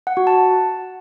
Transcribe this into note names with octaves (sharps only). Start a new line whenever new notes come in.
F#5
F#4
A5